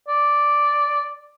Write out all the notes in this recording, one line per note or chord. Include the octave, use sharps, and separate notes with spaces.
D5